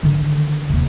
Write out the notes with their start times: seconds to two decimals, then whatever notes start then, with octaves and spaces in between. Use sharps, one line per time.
0.03 D3 D#3
0.70 D#2 C3